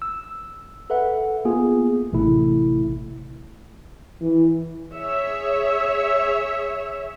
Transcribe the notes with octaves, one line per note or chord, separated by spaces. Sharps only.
E6
A4 B4 E5 F#5
A#3 B3 F4 G#4
A1 C3 A3 E4
E3
G#4 C#5 E5